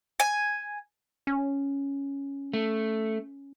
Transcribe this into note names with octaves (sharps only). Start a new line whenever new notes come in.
G#5
C#4
A3